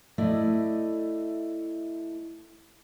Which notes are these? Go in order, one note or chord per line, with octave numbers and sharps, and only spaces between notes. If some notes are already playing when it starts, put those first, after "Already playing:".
A3 E4 D5 D#5